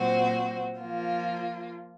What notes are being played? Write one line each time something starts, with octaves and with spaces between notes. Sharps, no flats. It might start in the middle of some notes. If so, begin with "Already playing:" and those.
Already playing: A#2 F#3 C4 F#4 C5
F3 A#3 F4